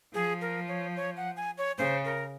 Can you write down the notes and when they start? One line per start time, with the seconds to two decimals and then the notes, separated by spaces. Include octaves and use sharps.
0.14 F3 G#4
0.41 A#4
0.68 C#5
0.96 C#5
1.17 F#5
1.37 G#5
1.58 C#5
1.78 C#3 C5
2.05 A#4